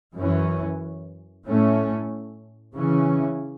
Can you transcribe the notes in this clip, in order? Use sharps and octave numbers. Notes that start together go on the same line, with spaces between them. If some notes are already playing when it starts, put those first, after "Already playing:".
F#2 E3 C#4
A2 A3 C#4
C#3 E3 C#4